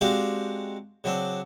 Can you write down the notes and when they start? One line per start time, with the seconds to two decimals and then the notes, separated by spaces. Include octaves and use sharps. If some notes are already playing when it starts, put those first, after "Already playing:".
0.01 G#3 C4 D4 F#4 G4 F5
1.04 C#3 F#3 C4 D4